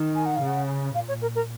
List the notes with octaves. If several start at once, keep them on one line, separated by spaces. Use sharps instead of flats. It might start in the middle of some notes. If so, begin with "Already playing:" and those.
Already playing: D#3
G#5
F#5
F5
C#3 F#5
A#2 F5
C#5
A#4
A#4